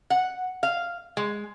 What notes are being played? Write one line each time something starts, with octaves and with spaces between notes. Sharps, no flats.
F#5
F5
G#3